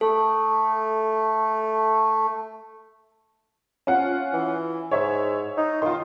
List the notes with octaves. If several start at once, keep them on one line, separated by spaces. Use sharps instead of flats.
A3 A4
C#4 F4 F#5
E3
G#2 C#5 E5
D#4
D#3 F4 C6